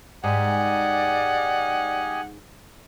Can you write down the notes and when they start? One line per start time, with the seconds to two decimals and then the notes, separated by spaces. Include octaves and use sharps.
0.24 G#2 G4 D5 D#5 F#5 G#5